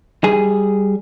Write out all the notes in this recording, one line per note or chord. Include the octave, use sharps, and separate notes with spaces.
G3 G#4